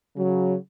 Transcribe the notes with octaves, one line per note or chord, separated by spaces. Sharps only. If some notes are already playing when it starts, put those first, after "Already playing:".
C#3 F#3